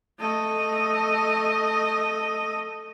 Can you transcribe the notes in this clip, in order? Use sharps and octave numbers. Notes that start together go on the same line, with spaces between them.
A3 D#5